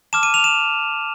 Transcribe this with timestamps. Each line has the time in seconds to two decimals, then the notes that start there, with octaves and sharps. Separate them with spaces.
0.13 A5 D6 F6 E7
0.23 D#7
0.34 F7
0.44 E7